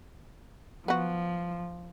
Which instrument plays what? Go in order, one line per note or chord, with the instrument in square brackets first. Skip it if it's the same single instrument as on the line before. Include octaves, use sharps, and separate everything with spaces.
[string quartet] F3 [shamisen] B3 F#4